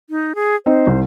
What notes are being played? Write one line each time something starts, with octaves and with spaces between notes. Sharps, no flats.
D#4
G#4
C4 D#4 C5
C2